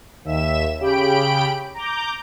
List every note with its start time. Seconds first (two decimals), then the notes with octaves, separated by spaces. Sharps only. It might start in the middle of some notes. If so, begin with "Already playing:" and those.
0.25 D#2 E5 E7
0.79 C#3 G4 G5 B5 D7
1.74 A#5 D6 G6